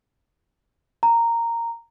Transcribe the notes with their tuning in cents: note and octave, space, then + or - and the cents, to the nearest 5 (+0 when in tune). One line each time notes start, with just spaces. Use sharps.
A#5 -10